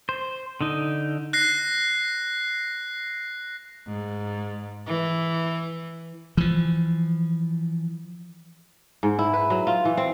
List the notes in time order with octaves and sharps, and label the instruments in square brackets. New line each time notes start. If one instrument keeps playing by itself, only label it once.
[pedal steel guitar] C5
D3 D#4
[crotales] F#6 A#6 C7
[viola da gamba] G#2
E3
[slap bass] E3 F3
[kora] G#2
E4
B4
F#3
F4
E3
C4